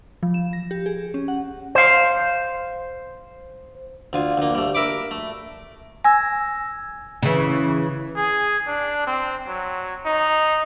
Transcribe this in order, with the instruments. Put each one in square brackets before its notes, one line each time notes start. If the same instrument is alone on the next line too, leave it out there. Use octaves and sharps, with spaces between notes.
[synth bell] F3
E7
A#6
G4
G#4
C#4
F#5
[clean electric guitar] C5 F5
[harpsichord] D2 F4 G#5
D2 A#3
G3 A3
A#4 E5 B5 D6
A3
[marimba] G#5 [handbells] E6 G#6 A#6
[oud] C#3 E3
[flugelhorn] G#4
D4
C4
F#3
D#4